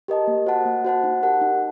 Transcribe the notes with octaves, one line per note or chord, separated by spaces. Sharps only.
G4 A#4 D#5 A5
A#3
F#4 C5 F#5 A5
A#3
F#4 C5 F#5 A5
D#4
G4 A#4 F#5 A5
D#4